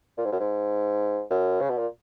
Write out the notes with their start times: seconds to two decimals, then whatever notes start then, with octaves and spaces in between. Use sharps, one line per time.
0.18 A#2
0.25 G#2
0.32 F#2
0.40 G#2
1.30 F#2
1.61 C#3
1.70 B2
1.78 A#2